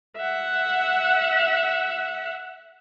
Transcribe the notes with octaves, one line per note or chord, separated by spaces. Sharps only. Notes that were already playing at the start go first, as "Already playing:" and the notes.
E5 F#5